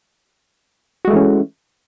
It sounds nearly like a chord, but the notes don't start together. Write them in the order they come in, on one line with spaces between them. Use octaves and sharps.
F#4 G#3 A3 E3 C#4